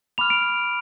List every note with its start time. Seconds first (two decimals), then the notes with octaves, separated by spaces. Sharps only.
0.18 B5 D6 F6 F7
0.30 D7